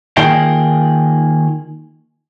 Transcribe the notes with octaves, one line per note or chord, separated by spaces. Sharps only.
D#3 A#3 F4 G#4 D#5 G5